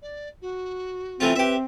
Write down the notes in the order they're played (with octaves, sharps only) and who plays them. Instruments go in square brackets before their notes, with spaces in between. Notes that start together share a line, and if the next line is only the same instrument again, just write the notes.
[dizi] D5
F#4
[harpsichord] E3 A3 F4 [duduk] C4
[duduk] C4 [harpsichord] G4 E5 [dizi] B4